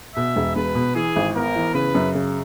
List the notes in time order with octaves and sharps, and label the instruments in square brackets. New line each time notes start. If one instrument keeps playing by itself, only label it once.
[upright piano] B2 [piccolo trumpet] E5
[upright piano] E1
[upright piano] E1 [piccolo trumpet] B4
[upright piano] B2
[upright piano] E3 [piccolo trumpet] G#4
[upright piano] G#1
[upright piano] B3 [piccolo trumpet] A#4
[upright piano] E3
[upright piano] C#3 [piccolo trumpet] B4
[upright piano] F#2
C#3